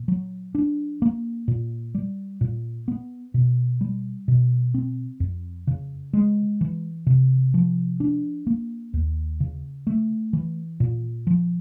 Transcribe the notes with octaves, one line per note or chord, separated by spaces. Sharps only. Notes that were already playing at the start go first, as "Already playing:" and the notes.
Already playing: A#2
F#3
D4
A#3
A#2
G3
A#2
B3
B2
G3
B2
C4
F2
C#3
G#3
E3
C3
F3
D4
A#3
D#2
C#3
A3
E3
A#2
F3